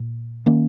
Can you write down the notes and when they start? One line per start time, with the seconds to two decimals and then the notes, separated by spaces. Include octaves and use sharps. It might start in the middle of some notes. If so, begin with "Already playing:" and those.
Already playing: A#2
0.46 D#3 A#3 C#4